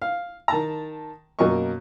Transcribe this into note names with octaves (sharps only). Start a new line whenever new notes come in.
F5
D#3 A5 A#5
F#2 B2 A#3 A#4 D#5 C#6